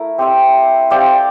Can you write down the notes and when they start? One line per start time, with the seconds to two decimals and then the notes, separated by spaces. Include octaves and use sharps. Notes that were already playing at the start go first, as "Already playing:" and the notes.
Already playing: A3 E4 A#4
0.18 C4 G4 C5 E5
0.90 C4 G4 D5 F5